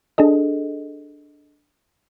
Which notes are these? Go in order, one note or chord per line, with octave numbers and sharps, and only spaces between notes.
D4 G#4 A4 D#5